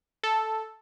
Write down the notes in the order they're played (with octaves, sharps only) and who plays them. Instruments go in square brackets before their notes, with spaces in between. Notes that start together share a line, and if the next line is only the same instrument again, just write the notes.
[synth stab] A4